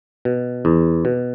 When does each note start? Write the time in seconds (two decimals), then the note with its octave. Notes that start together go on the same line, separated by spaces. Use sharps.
0.25 B2
0.65 E2
1.05 B2